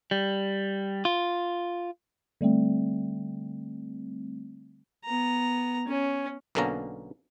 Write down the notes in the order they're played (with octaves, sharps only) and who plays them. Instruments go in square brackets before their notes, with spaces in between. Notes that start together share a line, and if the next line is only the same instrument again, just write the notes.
[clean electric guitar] G3
F4
[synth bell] D3 G3 A3 C4
[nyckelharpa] B3 A#5
C#4
[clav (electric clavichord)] B1 B2 D3 A#3 C#4 A#5